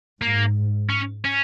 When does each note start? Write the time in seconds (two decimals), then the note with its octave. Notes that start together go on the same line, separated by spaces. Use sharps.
0.22 G#2 A#3
0.90 C#4
1.25 C#4